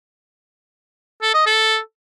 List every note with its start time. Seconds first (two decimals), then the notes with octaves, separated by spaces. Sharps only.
1.22 A4
1.34 D#5
1.46 A4